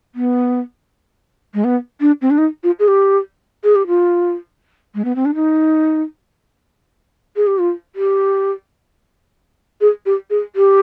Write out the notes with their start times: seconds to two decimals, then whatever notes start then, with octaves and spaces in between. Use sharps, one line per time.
0.15 B3
1.54 G#3
1.64 B3
2.01 D4
2.22 C4
2.30 D4
2.38 D#4
2.64 F4
2.79 G#4
2.88 G4
3.64 G#4
3.75 G4
3.87 F4
4.95 G#3
5.05 B3
5.16 C4
5.25 D4
5.35 D#4
7.36 G#4
7.47 G4
7.59 F4
7.96 G4
9.81 G#4
10.06 G4
10.30 G#4
10.56 G4